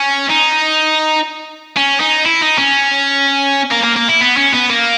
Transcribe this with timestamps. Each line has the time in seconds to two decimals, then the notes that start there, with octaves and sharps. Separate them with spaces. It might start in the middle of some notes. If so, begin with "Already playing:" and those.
Already playing: C#4
0.30 D#4
1.77 C#4
2.01 D#4
2.26 E4
2.41 D#4
2.58 C#4
3.72 A#3
3.84 A#3
3.96 A#3
4.08 E4
4.21 B3
4.37 C#4
4.53 B3
4.69 A#3